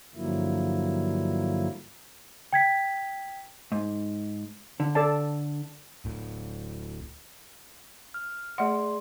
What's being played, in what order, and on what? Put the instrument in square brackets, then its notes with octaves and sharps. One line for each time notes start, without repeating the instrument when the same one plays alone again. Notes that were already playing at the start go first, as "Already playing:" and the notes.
[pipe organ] G2 D3 F3 F#3 A#3 E4
[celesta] G5 G#6 B6
[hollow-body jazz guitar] G#2
D3
[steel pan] A4 D5 A5
[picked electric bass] D1 A2
[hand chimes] F6
[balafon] A3 F#5 [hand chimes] G#4 D5 C6